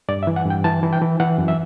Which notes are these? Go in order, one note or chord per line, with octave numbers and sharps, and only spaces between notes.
G2 D5
E5
E3
F#5
G2
G5
E3 A5
E3
G5
E3
E3 F#5
F#2
E5